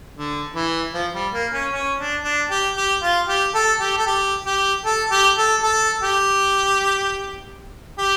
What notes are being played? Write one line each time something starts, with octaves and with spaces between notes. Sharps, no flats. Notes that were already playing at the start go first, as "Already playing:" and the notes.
D3
E3
F3
G3
A#3
C#4
C#4
D4
D4
G4
G4
F4
G4
A4
G4
A4
G4
G4
A4
G4
A4
A4
G4
G4